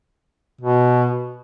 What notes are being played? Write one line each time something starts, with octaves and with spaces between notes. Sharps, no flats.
B2